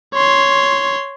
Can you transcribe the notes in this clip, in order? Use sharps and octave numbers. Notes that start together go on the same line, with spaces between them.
C#5 C6